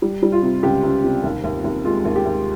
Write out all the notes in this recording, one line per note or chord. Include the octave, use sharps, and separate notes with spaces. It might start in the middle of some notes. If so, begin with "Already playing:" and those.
G3
G3
F4
C3
C#2 G4
C#2
C3
D#2
D#2
D#2
G#3 F4
D#2
G4
D#2